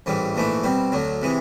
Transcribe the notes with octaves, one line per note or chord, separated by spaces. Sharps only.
A1 G#2 E3 G3
A#1 G#2 E3 A3 D4
B2 G3 C4
D2 D3 F#3
C3 E3 G#3